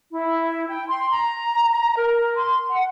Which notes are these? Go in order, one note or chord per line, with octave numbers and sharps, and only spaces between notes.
E4
G5
C6
A#5
A#4
C6
F#5